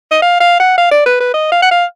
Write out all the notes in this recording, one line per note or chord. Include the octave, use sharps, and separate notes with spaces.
D#5
F5
F5
F#5
F5
D5
B4
B4
D#5
F5
F#5
F5